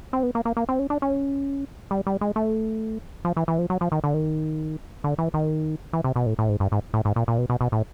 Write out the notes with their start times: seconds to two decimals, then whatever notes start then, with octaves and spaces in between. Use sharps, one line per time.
0.13 C4
0.23 B3
0.35 A#3
0.45 A#3
0.57 A#3
0.69 C4
0.79 C#4
0.90 D4
1.02 C#4
1.91 G3
2.07 G3
2.21 G#3
2.36 A3
3.25 F3
3.37 E3
3.48 E3
3.59 F3
3.70 F#3
3.81 F3
3.92 D#3
4.04 D3
4.14 D#3
5.04 D3
5.18 E3
5.34 D#3
5.93 E3
6.04 C3
6.16 B2
6.26 A2
6.39 A2
6.49 G#2
6.60 G2
6.72 G#2
6.94 A2
7.05 G#2
7.16 A#2
7.28 A#2
7.38 B2
7.50 B2
7.61 B2
7.72 A2